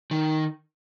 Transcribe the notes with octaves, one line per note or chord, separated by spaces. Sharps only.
D#3